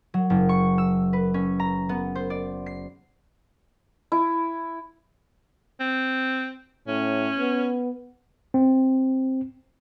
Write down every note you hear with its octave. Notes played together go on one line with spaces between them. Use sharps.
F#3
F#1
C#6
E6
B4
C#4
A#5
B3
C5
D5
C7
E4
C4
A2 C#4
B3
C4